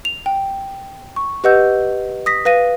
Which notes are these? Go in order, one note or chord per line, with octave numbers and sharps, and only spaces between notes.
F7
G5
C#6
G4 B4 D#5 F#5 E6 G6
D#6 A#6 B6
B4 F5 A#6 D#7